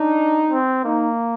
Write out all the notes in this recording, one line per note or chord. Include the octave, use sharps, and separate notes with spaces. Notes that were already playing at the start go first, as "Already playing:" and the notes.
Already playing: D4 D#4
C4
A#3 D#4